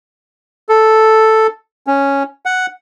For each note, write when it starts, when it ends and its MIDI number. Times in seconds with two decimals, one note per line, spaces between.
0.69 1.47 69
1.87 2.23 61
2.45 2.66 78